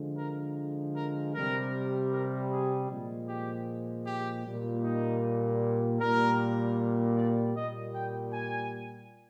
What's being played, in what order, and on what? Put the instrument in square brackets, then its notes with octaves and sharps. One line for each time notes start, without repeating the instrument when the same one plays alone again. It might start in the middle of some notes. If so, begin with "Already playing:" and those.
Already playing: [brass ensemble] D3 F3 G#3
A#4
A#4
C3 G3 A#4
A#4
G#4
A#2 F3 G#3
G4
G4
A#2 G3
D#4
A#2 G3 A#4
D5
A#2 G3 D#5
G5
G#5